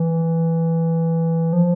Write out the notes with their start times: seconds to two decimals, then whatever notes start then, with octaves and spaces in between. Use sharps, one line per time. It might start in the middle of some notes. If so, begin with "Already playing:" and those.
Already playing: E3
1.53 F3